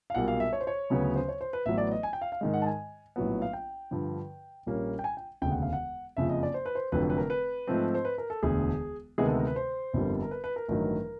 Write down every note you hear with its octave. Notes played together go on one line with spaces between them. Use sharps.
F5
B1 A#2 G3 A#3 F#5
F5
E5
C#5
C5
C#5
D2 C#3 F#3 B3
C5
C#5
C5
B4
A1 A2 F#3 B3 E5
D5
D#5
G#5
G5
F5
F5
G#2 D#3 G#3
F#5
A5
G#5
A#1 A2 F#3 B3
F5
G5
G2 D3 F3
A#1 A#2 G3 A#3 C#4
G5
G#5
G5
E1 D2 C#3 G5
F#5
F5
F#5
F#1 F2 C#3 F3 E5
D#5
D5
C5
B4
C5
F1 F2 D3 F#3 B4
B4
A#4
B4
G#2 F3 A3 C4
C5
B4
A#4
A4
E1 D2 D3 G#4
D2 C3 D#3 G#3 B3 G#4
A4
A#4
B4
C5
G1 F2 D3 G3 A#3
A#4
B4
B4
A#4
A1 G2 D#3 F#3 A#4